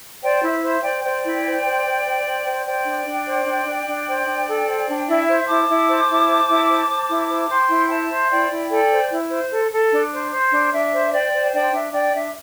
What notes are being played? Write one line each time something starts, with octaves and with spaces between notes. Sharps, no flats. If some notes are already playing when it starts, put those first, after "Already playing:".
C5 D5 G5
E4 E5
C5 E5
C5 D5 G5
C5 D5 G5
E4
C5
C5
C5
C5
C5
C5
C5 D5 G5
D4
D4
C5
D4
D4
D4
C5
D4
A4
C5
D4
E4 E5
C5
E4 A5 D6
E4
C5
E4
C5
E4
C5
C5
E4
C5
C5 G5 C6
E4
C5 E5 A5
C5
E4 D5 G5
E4
A4 D5 G5
C5
E4
C5
A4
A4
D4
C5
C5
D4
D4 E5
C5
C5 D5 G5
C5
D4 D5 G5
D4 E5
D4 D5 G5
D4 E5